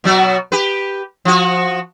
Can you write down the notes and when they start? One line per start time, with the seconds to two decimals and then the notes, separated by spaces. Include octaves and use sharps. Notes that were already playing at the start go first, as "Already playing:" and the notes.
0.04 B2 F#3 F#4
0.52 G4 B4
1.25 F3 F#4